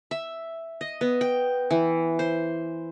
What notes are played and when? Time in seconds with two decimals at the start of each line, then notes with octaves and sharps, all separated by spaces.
0.11 E5
0.81 D#5
1.01 B3
1.21 G5
1.71 E3
2.19 C5